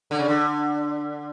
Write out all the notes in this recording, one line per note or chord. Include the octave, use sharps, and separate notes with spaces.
D3
C#3
D3